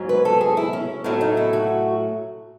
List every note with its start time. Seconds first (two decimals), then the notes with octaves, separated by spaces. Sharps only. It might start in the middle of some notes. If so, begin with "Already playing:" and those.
Already playing: G#2 F#3 C#4
0.09 B4
0.25 A4
0.41 G#4
0.57 E4
0.73 C#4
1.04 A2 F#3 A3 C#4 D#4
1.21 D#4
1.37 E4
1.53 F#4